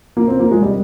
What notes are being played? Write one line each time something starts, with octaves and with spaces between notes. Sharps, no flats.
A#3
C4
A#3
G#3
G3